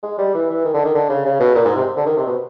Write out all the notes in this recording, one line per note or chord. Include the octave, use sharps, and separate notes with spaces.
G#3
G3
E3
E3
D#3
D3
D#3
D3
C#3
C#3
B2
A#2
G#2
C3
D3
D#3
C3
B2